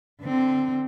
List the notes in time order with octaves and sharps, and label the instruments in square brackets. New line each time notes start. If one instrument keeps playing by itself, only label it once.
[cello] D3 C4